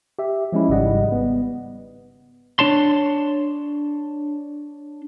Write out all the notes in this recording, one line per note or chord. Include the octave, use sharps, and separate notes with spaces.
G4 E5
F3 G#3 C#4 E4
G#1 G#2 C#3 G3 D#5 F#5
B3
D4 C#5 A5 C6